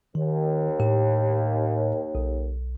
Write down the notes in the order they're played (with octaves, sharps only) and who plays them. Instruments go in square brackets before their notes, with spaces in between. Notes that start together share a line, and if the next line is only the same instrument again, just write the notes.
[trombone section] D#2 [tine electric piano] D#3
[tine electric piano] A2 G4
B1